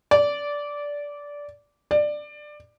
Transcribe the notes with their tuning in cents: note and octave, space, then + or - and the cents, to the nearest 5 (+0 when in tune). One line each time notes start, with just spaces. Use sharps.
D5 -15
D5 +15